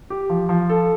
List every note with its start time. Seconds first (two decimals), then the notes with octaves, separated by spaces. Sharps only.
0.10 G4
0.30 F3
0.49 F3
0.70 A4